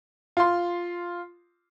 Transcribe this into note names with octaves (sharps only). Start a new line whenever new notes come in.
F4 C6